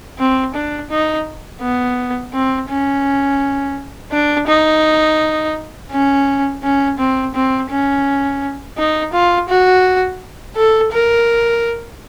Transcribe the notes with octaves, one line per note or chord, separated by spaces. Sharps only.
C4
D4
D#4
B3
C4
C#4
D4
D#4
C#4
C#4
C4
C4
C#4
D#4
F4
F#4
A4
A#4